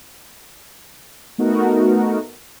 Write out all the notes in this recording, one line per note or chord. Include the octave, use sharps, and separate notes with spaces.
A3 B3 D#4 F#4 A#4